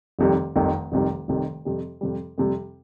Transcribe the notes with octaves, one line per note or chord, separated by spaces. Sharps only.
F1 F2 C3 D#3 G3
F1 F2 C3 D#3 G3
F1 F2 C3 D#3 G3
F1 F2 C3 D#3 G3
F2 C3 G3
F2 C3 G3
F2 C3 G3